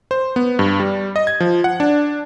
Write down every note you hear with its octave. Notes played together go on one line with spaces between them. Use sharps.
C5
B3
G2
G3
D#5
G#6
F3
F#5
D4